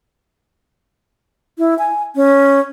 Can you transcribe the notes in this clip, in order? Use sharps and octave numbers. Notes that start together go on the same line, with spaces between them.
E4
G#5
C#4